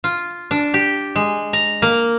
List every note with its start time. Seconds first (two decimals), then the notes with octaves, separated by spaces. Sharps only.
0.04 F4
0.51 D4
0.74 G4
1.16 G#3
1.53 A#5
1.82 A#3